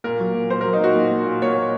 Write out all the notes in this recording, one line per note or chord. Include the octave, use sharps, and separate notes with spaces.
A#2 A#4
F#3
A#2
A#2 C5
F#3 A#4
D#4
A#2 F#4
A#2
A#2
A#2
A#2 C#5
A#2